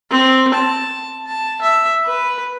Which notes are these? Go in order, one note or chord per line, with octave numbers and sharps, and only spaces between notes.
C4
A5
A5
E5
B4